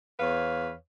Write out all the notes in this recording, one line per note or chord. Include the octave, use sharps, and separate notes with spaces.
E2 B4 C#5 F5